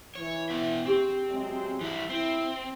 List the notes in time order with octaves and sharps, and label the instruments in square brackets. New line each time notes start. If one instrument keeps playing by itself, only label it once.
[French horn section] E3 [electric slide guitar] C#5
[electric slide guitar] B2 B3 E5
[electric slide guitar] C4 [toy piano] D4 G4 G#4
[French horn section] C3 F#3 G#3
[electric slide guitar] E3 G3 E4
[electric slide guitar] C4 [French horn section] E4